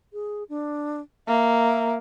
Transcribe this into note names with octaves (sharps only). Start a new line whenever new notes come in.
G#4
D4
A#3 E5